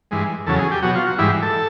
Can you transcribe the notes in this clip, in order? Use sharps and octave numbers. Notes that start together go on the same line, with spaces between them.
G2 E3 G#3
E2 C#3 F#3 A4
G#4
G4
B2 F#3 F#4
F4
F#4
G#2 E3 G3 E4
A4